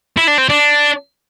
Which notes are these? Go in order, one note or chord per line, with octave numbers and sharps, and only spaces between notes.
E4
D4
C4
D4